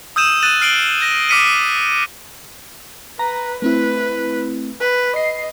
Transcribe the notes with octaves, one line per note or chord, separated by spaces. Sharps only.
D#6 E6 G6 D#7 E7
F#6 A6 D#7 E7 F#7
F6 C7 D7 F#7 G7
G6 A#6
D6 F6 B6 C#7 D#7
B4 A#5
A3 C4 E4 B4
B4
D#5 C7